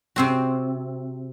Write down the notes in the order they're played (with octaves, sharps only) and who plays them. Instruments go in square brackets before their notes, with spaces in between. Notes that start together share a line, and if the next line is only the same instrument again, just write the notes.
[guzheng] C3 C4 F#4